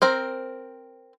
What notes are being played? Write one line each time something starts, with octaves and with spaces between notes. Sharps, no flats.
C4 A#4 C5